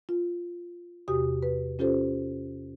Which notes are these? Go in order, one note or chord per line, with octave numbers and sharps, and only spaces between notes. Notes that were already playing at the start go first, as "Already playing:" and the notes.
F4
E2 C3 F#4 G4 D#6
B4
C#4 F4 G4 A4 C5